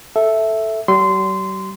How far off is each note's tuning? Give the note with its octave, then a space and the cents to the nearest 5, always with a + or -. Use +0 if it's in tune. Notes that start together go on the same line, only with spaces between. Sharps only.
A4 +0 E5 +0
G3 -45 C6 -20